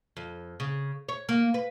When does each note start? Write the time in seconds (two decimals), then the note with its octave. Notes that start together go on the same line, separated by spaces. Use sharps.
0.17 F2
0.60 C#3
1.09 C#5
1.29 A#3
1.54 B4